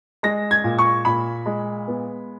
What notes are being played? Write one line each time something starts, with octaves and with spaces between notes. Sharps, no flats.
G#3 A#6
G#6
A#2
C#6
A#2 B5
G#3
B3